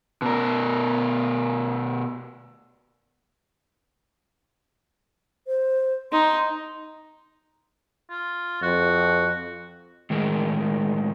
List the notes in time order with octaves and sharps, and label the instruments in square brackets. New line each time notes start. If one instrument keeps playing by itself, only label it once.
[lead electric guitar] B2 A#4
[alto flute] C5
[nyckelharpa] D#4 [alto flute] C6
[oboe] F4
[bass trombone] F2 [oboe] F#4
[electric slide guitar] A2 D#3 G#3 A#4